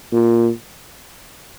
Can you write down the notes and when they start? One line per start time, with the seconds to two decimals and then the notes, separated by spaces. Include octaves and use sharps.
0.12 A#2